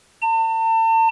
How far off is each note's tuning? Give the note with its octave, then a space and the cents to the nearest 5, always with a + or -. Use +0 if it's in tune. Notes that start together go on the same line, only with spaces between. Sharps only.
A5 +40